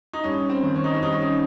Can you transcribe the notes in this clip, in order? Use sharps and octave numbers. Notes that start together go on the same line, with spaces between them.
D#4
G2 C#4
C4
D#3
C#4
D#4
C#4
G2 D#4
C#4
D#4